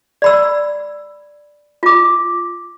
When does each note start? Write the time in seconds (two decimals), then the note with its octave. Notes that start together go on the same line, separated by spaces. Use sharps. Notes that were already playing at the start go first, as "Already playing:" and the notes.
0.22 D5 B5 E6
1.83 F4 D6